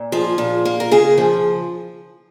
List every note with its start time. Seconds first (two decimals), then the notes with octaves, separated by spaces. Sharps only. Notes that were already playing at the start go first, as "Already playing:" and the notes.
Already playing: A#2
0.12 F3 G#4
0.38 A#2
0.65 A#3
0.80 A#4
0.91 C#3 G#4
1.18 F3